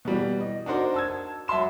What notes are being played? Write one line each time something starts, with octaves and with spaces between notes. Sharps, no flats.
B2 E3 G3
D#5
D4 D#4 F#4 A#4 C5 D5
A5 E6 G#6
F#3 E5 A5 C6 E7